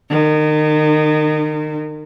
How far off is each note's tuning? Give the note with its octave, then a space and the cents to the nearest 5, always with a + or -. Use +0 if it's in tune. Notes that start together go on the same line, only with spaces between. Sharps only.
D#3 -30